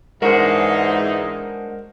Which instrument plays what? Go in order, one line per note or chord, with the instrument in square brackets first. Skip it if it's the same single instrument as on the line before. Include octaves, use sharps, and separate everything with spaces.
[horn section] G#2 E3 D#4 [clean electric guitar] G#3 D4 F#4 [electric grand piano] A#4 C5